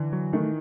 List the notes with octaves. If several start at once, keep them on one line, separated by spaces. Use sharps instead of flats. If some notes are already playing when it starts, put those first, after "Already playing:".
Already playing: D3 E3
F#3
D#3 A3